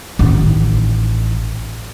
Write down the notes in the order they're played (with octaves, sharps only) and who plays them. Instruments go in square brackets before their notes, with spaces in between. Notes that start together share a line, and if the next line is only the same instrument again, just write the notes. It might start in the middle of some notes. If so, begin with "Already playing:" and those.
[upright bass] A1 D#3